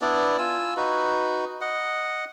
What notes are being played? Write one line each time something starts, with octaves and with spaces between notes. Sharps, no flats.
B3 D4 E4 D5
F4 G#5 E6
D#4 F#4 B4
D#5 F#5